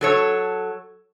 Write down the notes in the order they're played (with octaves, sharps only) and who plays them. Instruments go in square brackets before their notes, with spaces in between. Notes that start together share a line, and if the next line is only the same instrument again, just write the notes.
[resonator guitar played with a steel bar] F#3 A4 C#5